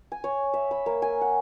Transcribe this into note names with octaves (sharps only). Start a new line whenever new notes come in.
G#5
C#5
E5
B5
A#3
G#5
F#5